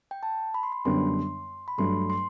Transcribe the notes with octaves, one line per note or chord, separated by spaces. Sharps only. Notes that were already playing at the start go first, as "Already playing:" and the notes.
G5
A5
B5
C6
B5
F#2 D3 G3 B3 D4 C6
B5
G2 F#3 A3 D4 C6
C6